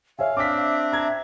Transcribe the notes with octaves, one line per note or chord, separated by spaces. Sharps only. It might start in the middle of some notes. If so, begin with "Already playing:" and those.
C#5 E5 F5 G#5
C4 D4 D6 B6
E5
A#5 G#6